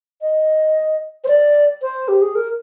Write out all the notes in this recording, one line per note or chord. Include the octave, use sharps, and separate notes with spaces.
D#5
C5
D5
C5
G4
G#4
A#4